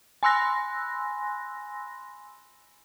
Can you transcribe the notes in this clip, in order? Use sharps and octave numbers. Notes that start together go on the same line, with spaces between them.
G#5 B5 C6 E6 F#6 A#6